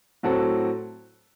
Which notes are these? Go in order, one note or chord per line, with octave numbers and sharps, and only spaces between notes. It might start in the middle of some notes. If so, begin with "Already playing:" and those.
A2 F#3 C4 F#4 A4